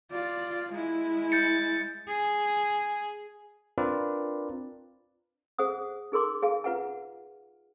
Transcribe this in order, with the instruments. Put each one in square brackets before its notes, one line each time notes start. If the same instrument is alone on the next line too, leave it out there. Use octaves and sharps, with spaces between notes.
[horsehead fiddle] F4 D5
G#3 E4
[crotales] G6 A6 C#7
[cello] G#4
[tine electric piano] C4 D4 F4 A#4 B4 D5
[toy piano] G#4 C5 F#5 D#6
D#4 G#4 A#4 C6 D6
G#4 F5 G#5
F4 B4 F#5 G#5